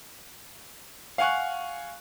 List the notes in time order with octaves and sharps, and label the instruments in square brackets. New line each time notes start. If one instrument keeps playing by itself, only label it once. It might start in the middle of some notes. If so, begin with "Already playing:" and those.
[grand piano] F5 F#5 G#5 C#6 F#6